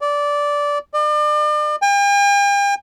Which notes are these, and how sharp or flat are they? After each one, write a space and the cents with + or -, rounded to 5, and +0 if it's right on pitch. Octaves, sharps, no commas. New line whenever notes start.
D5 -15
D5 +40
G5 +45